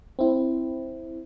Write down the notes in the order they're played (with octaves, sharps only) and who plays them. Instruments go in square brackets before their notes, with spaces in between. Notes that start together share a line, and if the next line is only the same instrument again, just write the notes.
[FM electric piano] C4 E4